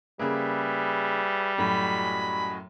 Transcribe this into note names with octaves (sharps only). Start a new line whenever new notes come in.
C#3 G3 A#3 G#4 B4 E5
F#2 A2 F#4 D#5 G#5 B5